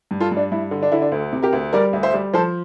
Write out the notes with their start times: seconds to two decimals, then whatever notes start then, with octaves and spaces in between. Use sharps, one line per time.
0.11 G2
0.20 F4 A4
0.31 G2
0.37 D4
0.52 G2 E4
0.71 D3
0.83 D4
0.92 D3 E4
1.02 D4
1.12 D2
1.33 C3
1.42 G4 A#4
1.53 D2
1.73 G3 A#4 D5
1.93 D2
2.03 C5 E5
2.14 G3
2.34 F3 A4 C5